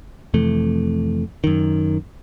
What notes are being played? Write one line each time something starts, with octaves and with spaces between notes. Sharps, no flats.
F2 C3 E3 A3
F#2 D#3